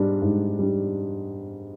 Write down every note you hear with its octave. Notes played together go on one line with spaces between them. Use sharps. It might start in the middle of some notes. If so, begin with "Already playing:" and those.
Already playing: G#2 G3 D4
G#2
G3 D4